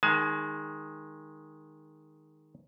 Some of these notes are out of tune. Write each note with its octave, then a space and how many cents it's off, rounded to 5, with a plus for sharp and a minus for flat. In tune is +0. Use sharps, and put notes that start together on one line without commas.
D#3 +0 G#3 +0 G#5 +40